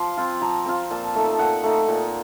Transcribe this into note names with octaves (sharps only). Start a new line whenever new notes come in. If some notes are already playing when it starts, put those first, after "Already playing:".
Already playing: F3 C6
C4 F4
F3 A#5
C4 F4
A#2 A5
A3 D#4
A#2 F#5
A3 D#4
A#2